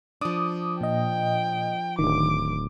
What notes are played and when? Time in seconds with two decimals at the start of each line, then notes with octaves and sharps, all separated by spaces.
0.21 F3 D4 D6 D#6
0.81 A#2 D#5 G5
1.99 D1 D#3 D6